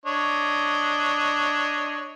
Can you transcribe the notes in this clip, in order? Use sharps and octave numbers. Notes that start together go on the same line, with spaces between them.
D4 C#5 D#5